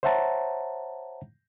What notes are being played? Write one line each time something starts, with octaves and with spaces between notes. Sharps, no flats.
C5 C#5 E5 F#5 A5 A#5